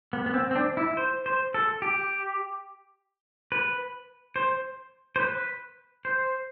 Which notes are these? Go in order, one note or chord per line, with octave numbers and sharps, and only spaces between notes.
B3
B3
C4
C4
D4
E4
C5
C5
A4
G4
B4
C5
C5
B4
C5